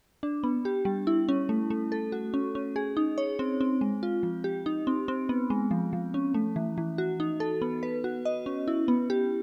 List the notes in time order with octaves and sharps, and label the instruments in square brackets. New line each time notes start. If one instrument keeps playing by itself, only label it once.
[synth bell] D4
B3
G4
G3
E4
C#4
A3
A3
A4
F#4
C#4
C#4
G#4
D#4
C#5
C4
C4
G#3
F4
F3
G4
D#4
C4
C4
B3
G#3
F3
F3
C#4
A3
E3
E3
F#4
D#4
A4
B3
B4
F#4
D#5
C#4
E4
B3
G4